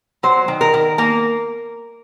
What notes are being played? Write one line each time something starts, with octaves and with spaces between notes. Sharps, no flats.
F#3 C5
D#3
A#4
D#3
A#3 A#4